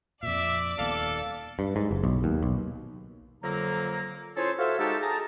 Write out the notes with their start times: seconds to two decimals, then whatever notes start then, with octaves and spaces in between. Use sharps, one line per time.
0.23 F2 A#2 D5 E5 D6
0.78 D#1 D#2 B3 A4 F5
1.59 G2
1.76 G#2
1.91 F#1
2.04 B1
2.24 D#2
2.42 B1
3.43 F2 D3 F#3 A#3 A#5
4.37 C#4 E4 F4 G#4 A4 C5
4.59 F#4 A4 C5 E5 F5
4.79 G#3 D#4 F#4 G4 A4
5.03 G#4 A5 A#5